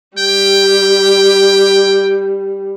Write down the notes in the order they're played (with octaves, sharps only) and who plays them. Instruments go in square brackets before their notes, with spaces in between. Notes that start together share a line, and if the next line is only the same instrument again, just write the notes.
[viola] G3 [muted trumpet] G5